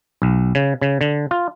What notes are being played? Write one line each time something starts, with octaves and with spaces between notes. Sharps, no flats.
B1
C#3
C#3
D3
F4